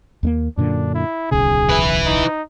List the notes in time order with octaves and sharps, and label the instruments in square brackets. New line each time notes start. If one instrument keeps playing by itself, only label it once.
[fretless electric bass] D#2 A3 A#3
[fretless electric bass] F#2 A#2 D3 [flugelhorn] D4
[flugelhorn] E4
[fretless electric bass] D1 B1 C#3 [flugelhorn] G#4
[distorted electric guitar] E4 B4
[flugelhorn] D#4